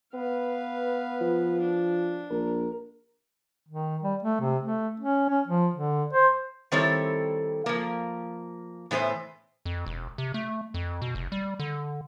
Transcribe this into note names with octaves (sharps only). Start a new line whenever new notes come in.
B3 B4 F5
F3
D4
A#1 A#4
D#3
G3
A3
C3
A3
C#4
C#4
F3
D3
C5
D#3 G3 C4 E4 A4 C#5
F3 A#3
A2 E3 B3 B4 C5
F2
E1
C3
A3
F2
B2
F1
G3
D3